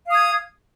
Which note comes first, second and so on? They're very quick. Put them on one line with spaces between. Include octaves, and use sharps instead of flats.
F5 D#6 G#6